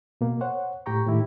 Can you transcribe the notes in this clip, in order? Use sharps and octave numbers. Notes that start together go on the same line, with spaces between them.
B2 A#3
C5 C#5 F#5
A2 G4 G5 A#5 C#6
A2 D#3 E4 G4